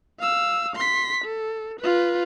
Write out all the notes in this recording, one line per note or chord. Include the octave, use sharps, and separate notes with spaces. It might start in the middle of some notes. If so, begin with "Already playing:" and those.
F5 E6
C6 B6
A4
F4 B4